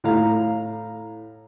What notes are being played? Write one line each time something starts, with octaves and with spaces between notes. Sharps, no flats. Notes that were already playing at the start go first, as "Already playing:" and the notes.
A2 F5 A#5